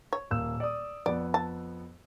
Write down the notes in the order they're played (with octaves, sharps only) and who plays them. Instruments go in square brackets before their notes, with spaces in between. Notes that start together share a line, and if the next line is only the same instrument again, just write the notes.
[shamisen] C#5
[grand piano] D#1 A#3 E6
D5 D#6
[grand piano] F2 B3 [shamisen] D5
[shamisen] A5